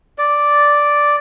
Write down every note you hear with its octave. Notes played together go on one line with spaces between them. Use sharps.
D5